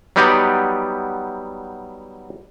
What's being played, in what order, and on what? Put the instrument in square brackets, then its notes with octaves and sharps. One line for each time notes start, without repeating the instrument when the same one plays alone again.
[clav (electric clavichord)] F#3 G3 B3 D#4 G4 D5